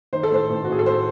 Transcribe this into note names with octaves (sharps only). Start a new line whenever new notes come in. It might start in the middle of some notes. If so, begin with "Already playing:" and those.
D#3 C5
A4
A1 C5
A1
F#4
A1 G#4
A4
C5